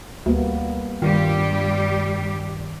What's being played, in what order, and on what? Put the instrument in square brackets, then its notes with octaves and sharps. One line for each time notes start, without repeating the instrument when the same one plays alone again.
[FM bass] D2 [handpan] G3 A#3 B3
[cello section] G2 G3 G4 [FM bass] D#3 [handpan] F4